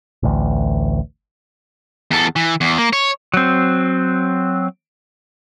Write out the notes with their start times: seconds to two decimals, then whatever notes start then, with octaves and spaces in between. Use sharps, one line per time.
0.23 A1 D2
2.11 E2 A4
2.36 E3
2.61 E2
2.78 A#3
2.93 C#5
3.34 F#3 C4